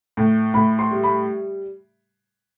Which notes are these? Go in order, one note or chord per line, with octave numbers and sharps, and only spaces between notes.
A2
A2 B5
C6
G3
B5